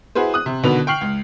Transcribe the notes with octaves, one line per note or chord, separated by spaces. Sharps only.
E4 F#4 G#4 B4 C5
D#6 F#6
C3
B2 D3 D#3 B3 B4 F7
G5 C#6 F6 C7 F#7
C#2